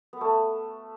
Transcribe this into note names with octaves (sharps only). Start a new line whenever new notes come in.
B3
A3